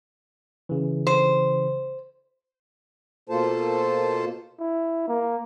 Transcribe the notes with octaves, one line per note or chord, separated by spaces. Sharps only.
C#3 E3
C5
B2 A#3 F4 A4 C5 A5
E4
A#3